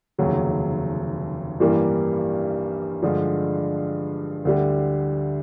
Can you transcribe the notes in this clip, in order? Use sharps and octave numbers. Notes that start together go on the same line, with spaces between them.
F1 D#2 C#3 F#3
A1 G2 E3 G3 A#3
G2 D3 F3 G#3
D2 D3 G3